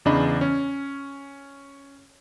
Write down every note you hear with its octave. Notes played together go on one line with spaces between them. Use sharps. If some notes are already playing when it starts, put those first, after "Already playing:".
E2 C#3 D4 D#5 B5
C#4